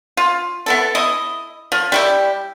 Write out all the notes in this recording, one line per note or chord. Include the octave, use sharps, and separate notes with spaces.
F4
B3 E4 A4
E4 D#5
F3
G3 E4 G4